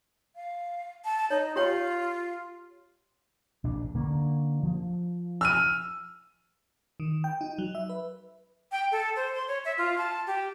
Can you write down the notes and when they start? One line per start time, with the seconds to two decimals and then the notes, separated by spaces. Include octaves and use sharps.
0.36 F5
1.05 A5
1.30 D#4 C#5
1.56 F4 G4 C#5 G5
3.64 A#1 D4
3.95 D3 A#3 C#4
4.63 F3
5.41 E6 F6 D#7
7.00 D#3
7.24 G5
7.41 D#4
7.58 F#3
7.75 E5
7.89 B4
8.72 G5
8.92 A4
9.16 C5
9.35 C6
9.48 C#5
9.65 E5
9.78 F4
9.98 A5
10.27 G4